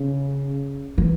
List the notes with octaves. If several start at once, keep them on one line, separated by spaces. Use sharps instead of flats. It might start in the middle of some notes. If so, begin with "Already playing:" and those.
Already playing: C#3
E3